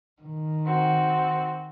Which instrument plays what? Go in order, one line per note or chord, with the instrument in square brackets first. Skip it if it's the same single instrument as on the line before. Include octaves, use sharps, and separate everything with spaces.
[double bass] D#3
[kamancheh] C4 F#4